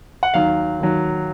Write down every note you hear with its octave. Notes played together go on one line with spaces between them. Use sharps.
F#5
D#2 D#3 F#3 F5
D#2 D#3 F#3